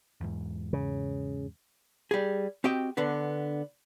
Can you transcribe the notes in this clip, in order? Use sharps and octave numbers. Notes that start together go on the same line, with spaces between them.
E2 G#2
C#3
G3 G#4
C4 F#4 G4 D#5 G5
D3 B3 D4 B4